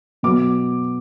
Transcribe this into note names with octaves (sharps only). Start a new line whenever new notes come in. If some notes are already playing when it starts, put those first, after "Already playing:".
B2 F#3 B3 D6